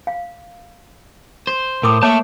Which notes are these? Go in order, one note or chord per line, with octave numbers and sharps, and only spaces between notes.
F5
C5
A2 A#4 D6 D#6
A3 A#3 C#5 E5 A5